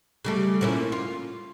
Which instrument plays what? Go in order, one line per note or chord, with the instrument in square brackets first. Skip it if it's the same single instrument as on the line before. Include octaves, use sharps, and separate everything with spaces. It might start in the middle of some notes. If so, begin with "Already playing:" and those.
[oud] C#3 G3 A3
A#2 C#4 E4
F4